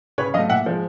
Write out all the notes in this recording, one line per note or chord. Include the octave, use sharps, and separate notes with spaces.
C#3 B4 C#5
F#3 A3 D#5 F5
A#2 E5 F#5
F3 G#3